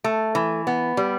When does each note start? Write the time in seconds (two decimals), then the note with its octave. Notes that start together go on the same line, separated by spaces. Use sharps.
0.04 A3
0.35 E3
0.67 B3
0.97 G3